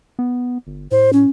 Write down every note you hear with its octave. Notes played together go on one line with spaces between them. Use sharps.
B3
G1
A2 C5
C#4